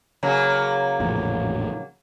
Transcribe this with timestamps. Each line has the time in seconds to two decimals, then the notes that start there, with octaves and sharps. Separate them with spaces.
0.23 C#3 F#3 A#3
1.00 A1 F2 A#2